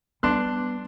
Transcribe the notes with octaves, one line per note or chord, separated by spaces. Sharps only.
G3 B3 D4 C6 F#6